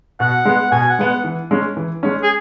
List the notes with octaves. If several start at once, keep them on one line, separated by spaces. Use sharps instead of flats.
B2 F#5
G#3 B3
B2 G#5
F#5
G#3 B3
F#5
E3
G#3 C#4
E3
G#3 C#4
G#4